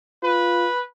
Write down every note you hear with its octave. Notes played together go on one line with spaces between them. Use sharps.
F4 B4